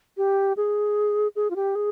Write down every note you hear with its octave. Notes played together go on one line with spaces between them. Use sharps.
G4
G#4
G#4
F4
G4
G#4